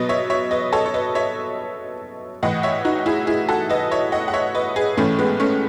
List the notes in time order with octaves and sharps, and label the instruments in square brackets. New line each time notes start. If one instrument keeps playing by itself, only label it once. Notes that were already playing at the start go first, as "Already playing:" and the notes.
Already playing: [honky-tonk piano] B2 F#3 B4 D#5
C#5 E5
C#5 E5
B4 D#5
A4 C#5
C#5
B4 D#5
C#5 E5
A2 E3 D#5 F#5
C#5 E5
D#4 F#4
E4 G#4
E4 G#4
F#4 A4
B4 D#5
C#5 E5
D#5 F#5
F#5
C#5 E5
B4 D#5
G#4 B4
A2 E3 A3 C#4
G#3 B3
A3 C#4